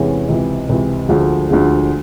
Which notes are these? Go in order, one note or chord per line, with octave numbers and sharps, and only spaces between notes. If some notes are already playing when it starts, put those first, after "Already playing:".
Already playing: E2 C3 E3 G#3 C#4
C#2 C3 E3
C#2 C3 E3
D2 D3 F3 G#3
D2 D3 F3 G#3